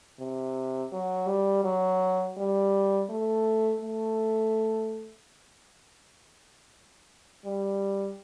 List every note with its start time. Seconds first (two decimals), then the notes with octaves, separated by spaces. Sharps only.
0.20 C3
0.92 F#3
1.28 G3
1.64 F#3
2.37 G3
3.09 A3
3.81 A3
7.45 G3